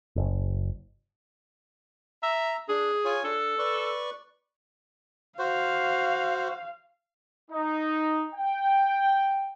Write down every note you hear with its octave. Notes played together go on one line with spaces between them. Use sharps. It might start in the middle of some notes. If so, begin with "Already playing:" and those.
F#1
E5 A#5
D4 G#4
F4 C#5 G#5
D4 A4
B4 D5 C#6
F#4 C5 F5
D#4
G5